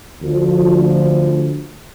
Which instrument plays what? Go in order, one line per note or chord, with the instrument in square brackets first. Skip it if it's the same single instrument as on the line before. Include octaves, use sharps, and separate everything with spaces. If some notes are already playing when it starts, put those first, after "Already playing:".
[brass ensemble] D2 F3